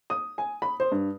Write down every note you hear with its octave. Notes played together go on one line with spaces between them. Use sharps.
D#6
G#5
B5
C5
G2